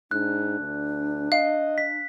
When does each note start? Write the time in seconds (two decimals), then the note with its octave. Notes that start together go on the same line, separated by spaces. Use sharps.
0.11 G#2 D4 F#6
0.60 D2
1.32 D#5 F5
1.78 B6